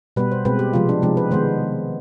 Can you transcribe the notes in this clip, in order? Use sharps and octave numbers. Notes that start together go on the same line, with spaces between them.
B2 G3 B3 B4
C5
B2 G#3 C4 B4
G4
C3 F3 G#3 F4
D4
C3 F3 G#3 C4 D#4
B4
D#3 G#3 B3 C5